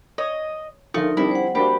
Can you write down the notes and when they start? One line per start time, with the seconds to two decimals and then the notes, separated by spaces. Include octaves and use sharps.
0.18 C#5 D#5
0.94 D3 F3 A3 D#4 F4 A#4
1.17 G3 C4 D4 E4
1.31 C5 F#5
1.55 A#3 D4 F#4 G4 C5 B5